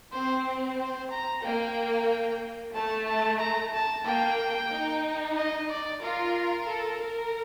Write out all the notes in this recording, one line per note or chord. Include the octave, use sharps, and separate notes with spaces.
C4 C5
C5
A#5
A#3 G5
A3 A5
A5
A#5
A5
A#3 G5
D#4
D#5
D5
F4 A#4
A4
A#4